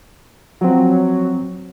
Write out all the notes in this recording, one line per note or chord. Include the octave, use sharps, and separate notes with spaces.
F3 F#3 C4